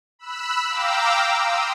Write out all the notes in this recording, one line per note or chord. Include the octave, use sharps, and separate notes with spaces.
B5 E6 F#6
F5 G5 A#5 D6 E6
C6 D#6 E6